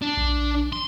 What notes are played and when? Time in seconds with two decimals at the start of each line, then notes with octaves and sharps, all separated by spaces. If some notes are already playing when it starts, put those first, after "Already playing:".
0.02 D4
0.17 A#1
0.73 C6